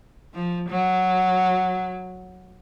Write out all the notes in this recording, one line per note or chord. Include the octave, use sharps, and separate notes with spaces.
F3
F#3